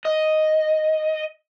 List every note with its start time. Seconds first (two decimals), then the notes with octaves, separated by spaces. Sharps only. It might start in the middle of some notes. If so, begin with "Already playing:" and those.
0.05 D#5